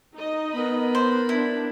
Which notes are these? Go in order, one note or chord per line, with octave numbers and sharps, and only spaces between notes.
D#4 D#5
B3 A#4 B5
C5
D4 E4